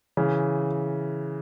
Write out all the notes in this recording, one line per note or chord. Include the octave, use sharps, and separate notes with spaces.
C#3 E3